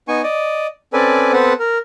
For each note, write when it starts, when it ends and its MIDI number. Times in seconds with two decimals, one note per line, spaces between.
0.08 0.22 59
0.08 0.22 63
0.08 0.22 80
0.08 0.22 85
0.23 0.67 74
0.23 0.67 75
0.93 1.33 60
0.93 1.33 61
0.93 1.33 69
0.93 1.33 71
0.93 1.33 74
0.93 1.33 80
1.33 1.53 59
1.33 1.53 60
1.33 1.53 69
1.33 1.53 71
1.33 1.53 72
1.33 1.53 78
1.60 1.78 70